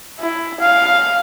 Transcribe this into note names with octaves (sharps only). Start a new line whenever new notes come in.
E4
F5